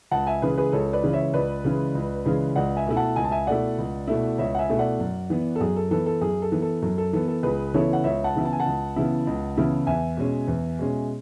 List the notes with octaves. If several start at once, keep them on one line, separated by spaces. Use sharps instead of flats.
C#2 F#5 A5
E5 G#5
C#3 E3 G#3 G#4 B4
G#4 B4
C#2 A4 C#5
B4 D5
C#3 E3 G#3
C#5 E5
C#2 B4 D5
C#3 E3 G#3
C#2
C#3 E3 G#3
C#2 D5 F#5
E5 G#5
B2 A3 E4
F#5 A5
C#2 G#5
A5
E5 G#5
B2 A3 E4 D5 F#5
C#2
B2 A3 E4
C#2 C#5 E5
F#5
E5 G#5
B2 A3 E4
D5 F#5
F#2
E3 B3
A4
F#2 G#4
A4
E3 B3 A4
A4
F#2 G#4
A4
E3 B3
A4
F#2 A4
A4
E3 B3 A4
A4
C#2 G#4 B4
C#3 E3 B3 E4 A4 C#5
F#5
C#2 C#5 E5
F#5 A5
C#3 E3 B3 E4
A5
G#5
F#5 A5
C#2
C#3 E3 B3 E4
C#2
C#3 E3 B3 E4
E2 E5 G#5
B2 G#3 C#4
E2
B2 G#3 C#4